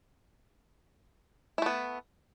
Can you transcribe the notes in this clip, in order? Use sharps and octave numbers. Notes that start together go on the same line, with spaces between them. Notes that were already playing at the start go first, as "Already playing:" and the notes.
A3 B3 E4